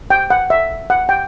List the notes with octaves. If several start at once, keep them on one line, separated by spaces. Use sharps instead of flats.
G5
F#5
E5
F#5
G5